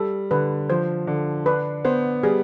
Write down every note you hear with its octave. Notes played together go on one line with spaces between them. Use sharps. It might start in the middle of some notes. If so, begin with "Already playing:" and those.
Already playing: G3 A4
D3 B4
F3 C5
D3
D4 B4
B3 C5
G3 G#4